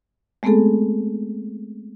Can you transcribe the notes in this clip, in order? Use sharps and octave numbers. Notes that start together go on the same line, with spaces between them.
G#3 A3 B3 C4 G#4 A4